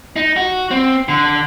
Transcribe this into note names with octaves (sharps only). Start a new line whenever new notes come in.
D#4
F#4
C4
D3